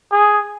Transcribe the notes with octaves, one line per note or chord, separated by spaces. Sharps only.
G#4